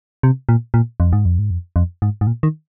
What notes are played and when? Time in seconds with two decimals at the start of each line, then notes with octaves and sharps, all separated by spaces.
0.23 C3
0.49 A#2
0.74 A#2
1.00 F2
1.13 G#2
1.25 F2
1.39 G#2
1.51 F2
1.76 F2
2.02 G#2
2.21 G#2
2.27 A#2
2.43 D#3